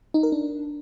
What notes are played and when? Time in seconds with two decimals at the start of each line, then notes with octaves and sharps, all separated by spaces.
0.14 D#4
0.23 A#4
0.32 D4